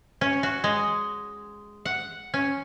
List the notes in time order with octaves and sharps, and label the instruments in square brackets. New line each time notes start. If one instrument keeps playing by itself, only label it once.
[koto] C#4
F#4
G#3
F#5
C#4